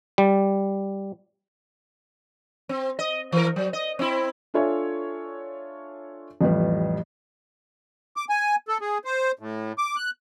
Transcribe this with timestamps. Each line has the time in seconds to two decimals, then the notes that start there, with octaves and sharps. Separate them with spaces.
0.18 G3
2.69 C4
2.99 D#5
3.32 E3 A#4
3.56 F#3
3.73 D#5
3.99 C4 E4
4.54 D4 F4 A4 C#5 E5 G#5
6.41 A1 F2 G3 B4
8.17 D6
8.29 G#5
8.68 A4
8.81 G#4
9.05 C5
9.39 A2
9.78 D6
9.96 F#6